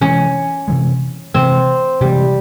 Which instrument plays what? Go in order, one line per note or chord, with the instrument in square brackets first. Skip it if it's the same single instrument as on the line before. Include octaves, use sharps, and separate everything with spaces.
[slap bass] C3 E3 G#3 [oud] C#4
[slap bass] C3 E3 G#3
[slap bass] C3 E3 G#3 [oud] C4
[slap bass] C3 E3 G#3 [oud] G3